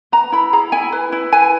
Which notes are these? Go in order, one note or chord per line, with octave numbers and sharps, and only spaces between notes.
B4 A#5
E4 B5
G#4 A#5
E4 G#5
B4
E4
B4 G#5